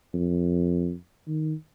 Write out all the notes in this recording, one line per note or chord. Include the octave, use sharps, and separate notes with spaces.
F2
D#3